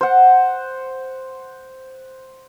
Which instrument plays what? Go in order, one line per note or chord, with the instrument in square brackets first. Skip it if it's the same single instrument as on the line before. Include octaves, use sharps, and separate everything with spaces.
[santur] C5 F#5